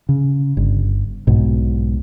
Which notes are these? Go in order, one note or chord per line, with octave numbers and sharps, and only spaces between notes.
C#3
G1
B1 G#2